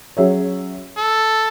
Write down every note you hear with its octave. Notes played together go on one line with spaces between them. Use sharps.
F#3 C#4 G#4 C#5 E5
A4